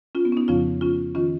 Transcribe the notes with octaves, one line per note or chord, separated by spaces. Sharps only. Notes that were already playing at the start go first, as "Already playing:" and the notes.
C#4 F4
B3
C#4
B3 D#4
F2 C#3 F3 C#4 F4
C#4 F4
D#3 C#4 F4